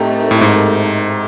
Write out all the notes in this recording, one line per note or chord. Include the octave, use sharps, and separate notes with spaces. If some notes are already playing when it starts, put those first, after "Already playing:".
Already playing: A2 A3 C4 D#4 G4 A#4
A2
G#2